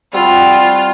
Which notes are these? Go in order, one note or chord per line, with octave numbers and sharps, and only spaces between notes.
G3 C4 F4 F#4